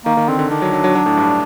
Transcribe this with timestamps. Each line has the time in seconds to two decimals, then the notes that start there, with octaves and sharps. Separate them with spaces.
0.06 D#3 A#3
0.17 D#3
0.28 D3 C4
0.39 D3
0.50 D#3 D4
0.62 F#3
0.73 F#3
0.84 F#3
0.95 F#3
1.06 A2
1.17 G2